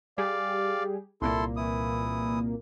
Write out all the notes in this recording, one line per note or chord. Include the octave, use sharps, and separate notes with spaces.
G3 G4 G#4 D5 F5
C2 A#2 A#3 E4 A4 C6
E3 E4 D#6